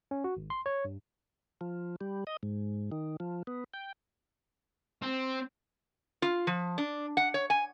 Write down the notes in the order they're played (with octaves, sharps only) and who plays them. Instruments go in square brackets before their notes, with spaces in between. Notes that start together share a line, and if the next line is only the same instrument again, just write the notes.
[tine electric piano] C#4
F#4
G#1
C6
C#5
G2
[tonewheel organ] F3
G3
D#5
G#2
D#3
F3
B3
G5
[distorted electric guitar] C4
[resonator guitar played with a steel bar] F4
F3
D4
F#5
C#5
G#5